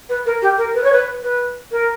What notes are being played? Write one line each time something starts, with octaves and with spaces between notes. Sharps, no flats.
B4
A#4
G4
A#4
B4
C#5
B4
B4
A#4